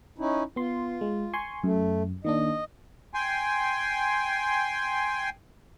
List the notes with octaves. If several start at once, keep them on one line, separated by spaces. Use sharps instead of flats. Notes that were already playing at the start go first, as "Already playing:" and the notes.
C#4 D#4 E4
B3 F4 C6
G#3
G#5 C6 C#6
F#2 A3
D#3 A#3 D4 D#5
G5 G#5 C6